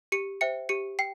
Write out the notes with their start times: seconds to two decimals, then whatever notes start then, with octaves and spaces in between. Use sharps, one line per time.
0.12 G4 C#7
0.41 C5 E5 G5 C#7
0.69 G4 C#7
0.99 G5 C7